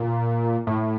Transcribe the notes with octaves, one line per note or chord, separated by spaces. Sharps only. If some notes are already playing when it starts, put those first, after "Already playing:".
Already playing: A#2
A2